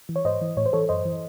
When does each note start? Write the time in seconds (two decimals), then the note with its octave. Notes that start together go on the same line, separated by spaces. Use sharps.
0.09 E3
0.16 C#5
0.25 G#2 C5 D#5
0.41 E3
0.57 A2 C#5
0.66 C5
0.73 E3 A4 C#5
0.89 F#2 C5 D#5
1.05 E3